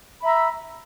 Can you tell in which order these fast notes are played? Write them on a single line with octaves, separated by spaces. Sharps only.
B5 E5 A#5 E6